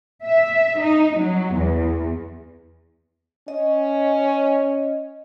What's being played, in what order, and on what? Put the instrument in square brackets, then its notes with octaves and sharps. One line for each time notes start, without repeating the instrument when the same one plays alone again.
[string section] E5
D#4
F#3
E2
[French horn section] C#4 [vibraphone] D#5